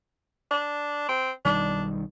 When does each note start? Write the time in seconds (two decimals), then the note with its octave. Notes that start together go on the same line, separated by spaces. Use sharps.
0.51 D4
1.09 C4
1.45 B1 D#3 G3 D4